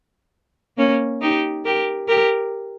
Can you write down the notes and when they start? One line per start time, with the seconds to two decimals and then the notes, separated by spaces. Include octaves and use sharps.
0.77 A#3 C#4
1.21 D#4 G4
1.65 G4 A#4
2.08 G4 A#4